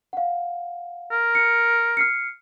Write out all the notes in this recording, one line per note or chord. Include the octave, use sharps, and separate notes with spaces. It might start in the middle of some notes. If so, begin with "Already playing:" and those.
F5 F#5
A#4
C#7
F6 C7 C#7